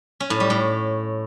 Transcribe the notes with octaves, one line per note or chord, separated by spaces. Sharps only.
C#4
A2
G3
A2